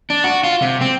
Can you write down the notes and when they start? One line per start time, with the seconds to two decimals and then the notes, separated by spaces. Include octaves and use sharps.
0.10 D4
0.24 F#4
0.44 F4
0.62 C3
0.81 C4